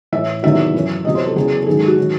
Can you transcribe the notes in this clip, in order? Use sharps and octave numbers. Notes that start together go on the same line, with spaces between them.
A2 E3 E5
E2 C3 D#3 F#3 E5
F#2 E3
E2 C3 F#3 D#5
C5
A4
E2 C#3 F#3 G#4
A4
G#2 D#3 F#3 G#4
A4
F#4
D#3 F#3